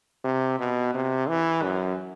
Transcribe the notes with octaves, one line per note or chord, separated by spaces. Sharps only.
C3
B2
C3
E3
F#2